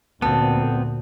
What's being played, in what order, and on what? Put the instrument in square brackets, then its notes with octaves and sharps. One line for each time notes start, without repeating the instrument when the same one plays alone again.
[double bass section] D2 A#2 [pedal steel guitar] B3 C4 [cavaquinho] A4